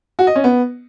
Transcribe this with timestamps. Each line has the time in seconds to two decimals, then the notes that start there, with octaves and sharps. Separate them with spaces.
0.19 F#4
0.27 D#5
0.36 C#4
0.44 B3